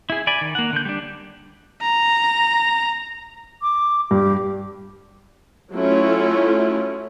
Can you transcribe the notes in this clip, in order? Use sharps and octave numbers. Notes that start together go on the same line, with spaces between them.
E4 G#4
D5 G#5 B5
D#3
A#3 F#5
D3 G6
G3 D4
A#5
D6
G2 G4
F#3 A3 C#4 E4 F4